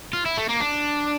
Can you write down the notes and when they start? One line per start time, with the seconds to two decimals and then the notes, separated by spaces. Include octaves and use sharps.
0.13 F4
0.26 E4
0.37 A3
0.49 A#3
0.60 D4